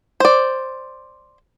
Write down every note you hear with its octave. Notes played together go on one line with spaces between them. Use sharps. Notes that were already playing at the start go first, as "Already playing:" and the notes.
C5 D5